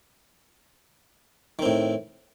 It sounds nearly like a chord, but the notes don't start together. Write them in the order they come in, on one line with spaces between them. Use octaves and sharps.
D#3 C4 A2